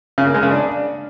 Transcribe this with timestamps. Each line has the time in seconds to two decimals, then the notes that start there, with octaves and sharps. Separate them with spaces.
0.18 C#3
0.26 A#3
0.34 G#3
0.43 C#3
0.51 D4